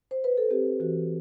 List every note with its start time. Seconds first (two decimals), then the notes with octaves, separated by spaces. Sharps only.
0.11 C5
0.24 B4
0.38 A4
0.50 C4 G4
0.80 E3 F#4